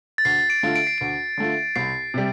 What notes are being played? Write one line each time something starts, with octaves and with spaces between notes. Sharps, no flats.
A6
D2 C7
D7
D3 A3 F4
D7
C7
D2 D7
D3 A3 F4
C2 C7
C3 G3